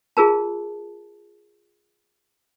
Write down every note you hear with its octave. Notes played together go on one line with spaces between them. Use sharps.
F4 G#4 A#4 A5